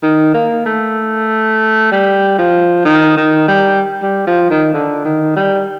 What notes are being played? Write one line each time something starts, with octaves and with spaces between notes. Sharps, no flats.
D#3
A#3
A3
G3
F3
D#3
D#3
G3
G3
F3
D#3
D3
D#3
G3